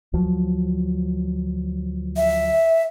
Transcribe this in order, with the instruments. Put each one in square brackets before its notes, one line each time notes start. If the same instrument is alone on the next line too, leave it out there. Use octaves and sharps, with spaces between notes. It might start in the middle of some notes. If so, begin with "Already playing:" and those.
[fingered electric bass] D2 F3 F#3
[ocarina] E5